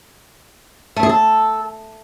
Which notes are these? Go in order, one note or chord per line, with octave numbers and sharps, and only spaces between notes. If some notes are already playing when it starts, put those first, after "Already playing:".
A3
G#4
A4